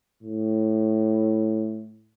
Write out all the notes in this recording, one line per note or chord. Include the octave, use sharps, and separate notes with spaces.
A2